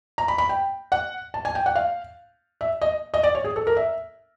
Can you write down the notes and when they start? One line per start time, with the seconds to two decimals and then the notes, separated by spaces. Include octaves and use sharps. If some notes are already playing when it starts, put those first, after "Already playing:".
0.18 A#5
0.28 B5
0.38 B5
0.49 G5
0.92 F#5
1.34 A5
1.45 G#5
1.55 G5
1.66 F#5
1.76 F5
2.61 E5
2.82 D#5
3.14 D#5
3.23 D5
3.35 C#5
3.44 G#4
3.56 A4
3.67 A#4
3.77 E5